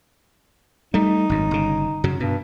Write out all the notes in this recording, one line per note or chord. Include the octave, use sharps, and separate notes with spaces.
G3 A3 D#4
G#1 F#2
G1 C#3
F#2 C#3 F#3
G2 B2